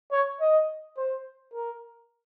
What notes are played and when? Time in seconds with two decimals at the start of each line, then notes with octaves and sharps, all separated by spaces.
0.12 C#5
0.41 D#5
0.97 C5
1.54 A#4